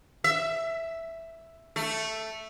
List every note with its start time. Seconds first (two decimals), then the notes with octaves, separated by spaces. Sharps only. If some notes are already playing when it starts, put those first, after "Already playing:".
0.24 E5
1.76 A3